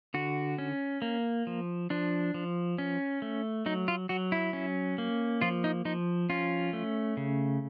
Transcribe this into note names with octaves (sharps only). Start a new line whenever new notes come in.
D3 F#4
C#4
A#3
F3
F3 D4
F3
C#4
A3
F#3 D#4
F4
F#3 F#4
E4
C#4
A#3
F3 F4
D#4
F3 D#4
C#4 F4
A3
C#3